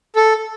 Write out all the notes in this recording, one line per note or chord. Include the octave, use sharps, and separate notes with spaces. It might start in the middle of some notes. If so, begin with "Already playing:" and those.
A4